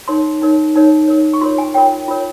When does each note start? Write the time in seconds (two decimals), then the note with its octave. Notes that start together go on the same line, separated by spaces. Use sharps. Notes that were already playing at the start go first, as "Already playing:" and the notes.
0.08 D#4 A#4 C#5 C6
0.42 D#4 A#4 C#5
0.75 D#4 A#4 C#5
1.08 D#4 A#4 C#5
1.34 C#6
1.41 F4 A#4 C#5 C6
1.58 G#5
1.74 F4 A#4 C#5 G5
2.08 F4 A#4 C#5